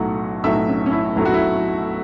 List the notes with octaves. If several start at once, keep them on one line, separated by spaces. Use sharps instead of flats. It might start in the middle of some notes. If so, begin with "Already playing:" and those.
Already playing: B1 A2 F#3 A3 F#4
B1 A2 F#3 A3 E5
C#4
C#4
E4
B1 A2 F#3 A3 E4
F#4
E4